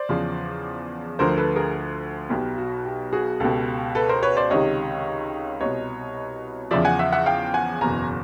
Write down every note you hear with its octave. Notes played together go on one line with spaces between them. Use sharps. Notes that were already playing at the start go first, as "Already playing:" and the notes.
Already playing: C5 D5
E2 C#3 F3
D2 D3 F3 A#4 C5
A4 B4
G#4 A#4
B1 B2 G4
F#4
G4
F#4 G#4
C#2 B2 G4 A4
A4 B4
A#4 C5
B4 C#5
C5 D5
C#2 C3 D#3 C#5 D#5
C2 B2 C#5 D#5
E2 C#3 F3 D5 E5
F#5 G#5
E5 F#5
E5 F#5
F5 G5
F#5 G#5
F#1 E2 B2 G#5 A#5